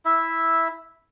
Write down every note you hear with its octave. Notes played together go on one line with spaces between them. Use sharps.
E4 E5